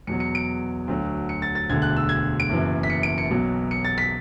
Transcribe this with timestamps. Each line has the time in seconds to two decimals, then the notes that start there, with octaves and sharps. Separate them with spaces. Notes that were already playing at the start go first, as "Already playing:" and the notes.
0.07 E2 B2 F#3 C#7
0.20 C#7
0.35 D7
0.88 D2 D3 F#3
1.29 C#7
1.42 A6
1.55 A6
1.69 E1 D2 D3 G#6
1.82 F#6
1.97 E6
2.09 G#6
2.40 D7
2.50 F#1 F#2 E3
2.83 B6
2.90 C#7
3.03 D7
3.18 C#7
3.31 B1 B2 F#3
3.71 C#7
3.85 A6
3.98 B6